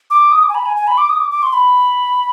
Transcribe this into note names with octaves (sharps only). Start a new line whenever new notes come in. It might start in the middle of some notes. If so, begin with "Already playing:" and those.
D6
D#6
D6
G#5
B5
G#5
G#5
B5
D6
D#6
D6
D6
C6
B5